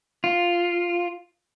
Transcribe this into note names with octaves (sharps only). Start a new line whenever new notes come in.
F4